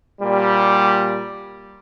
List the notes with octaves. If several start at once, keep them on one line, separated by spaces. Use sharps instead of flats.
A#2 G3